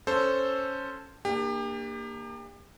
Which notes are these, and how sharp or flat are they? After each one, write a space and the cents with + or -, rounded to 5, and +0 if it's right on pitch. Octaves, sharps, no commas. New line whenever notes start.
C#4 +0 A4 +0 C5 +0
A#3 +0 D4 +30 G4 +35